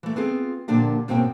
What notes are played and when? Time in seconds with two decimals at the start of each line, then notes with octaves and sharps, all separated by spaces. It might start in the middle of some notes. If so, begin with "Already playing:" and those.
0.03 E3 A3
0.16 B3 C4 F4 G#4
0.68 A#2 D3 F3 A#3 D4 G4
1.08 G#2 B2 A#3 C4 C#4 G5